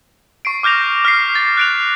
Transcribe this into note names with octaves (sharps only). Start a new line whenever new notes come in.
C#6 C7 D7
D6 F6 G6 A#6 F7
F6 B6 C7
A6
F#6 D7 F7